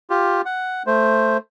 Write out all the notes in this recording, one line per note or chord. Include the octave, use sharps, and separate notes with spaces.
F4 G4
F#5
A3 C5